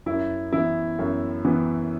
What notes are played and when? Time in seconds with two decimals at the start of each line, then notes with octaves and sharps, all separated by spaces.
0.06 F#2 E4
0.53 E3 B3 E4
0.99 F#2
1.45 E3 B3